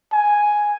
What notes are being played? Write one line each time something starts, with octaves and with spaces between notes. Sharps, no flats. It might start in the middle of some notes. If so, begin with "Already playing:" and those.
G#5